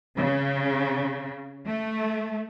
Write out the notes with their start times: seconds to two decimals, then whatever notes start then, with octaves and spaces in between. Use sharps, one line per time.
0.17 C#3
1.66 A3